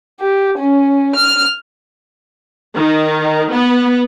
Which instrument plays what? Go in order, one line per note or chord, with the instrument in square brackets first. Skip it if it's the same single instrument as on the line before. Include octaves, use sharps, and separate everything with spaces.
[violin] G4
C#4
F6
[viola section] D#3
B3